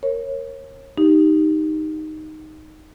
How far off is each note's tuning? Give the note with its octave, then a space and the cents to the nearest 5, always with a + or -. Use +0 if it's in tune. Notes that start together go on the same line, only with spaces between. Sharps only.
A#4 +0 C#5 -30
D#4 +0 G4 +0